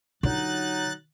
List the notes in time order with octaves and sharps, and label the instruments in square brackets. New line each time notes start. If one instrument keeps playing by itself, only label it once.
[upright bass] D3 F4 [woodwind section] F#3 D#4 [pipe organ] F#6 A6